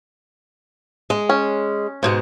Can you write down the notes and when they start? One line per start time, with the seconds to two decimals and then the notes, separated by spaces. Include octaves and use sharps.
1.10 G#3
1.29 C#4
2.03 G#2 B2 G#3